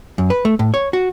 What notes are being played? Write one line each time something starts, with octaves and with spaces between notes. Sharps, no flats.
F#2
B4
A3
A2
C#5
F#4